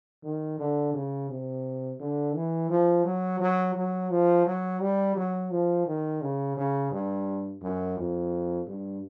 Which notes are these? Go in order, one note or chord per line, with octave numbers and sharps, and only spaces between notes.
D#3
D3
C#3
C3
D3
E3
F3
F#3
F#3
F#3
F3
F#3
G3
F#3
F3
D#3
C#3
C#3
G2
F#2
F2
G2